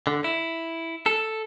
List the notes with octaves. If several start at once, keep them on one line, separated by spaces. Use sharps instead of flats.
D3
E4
A4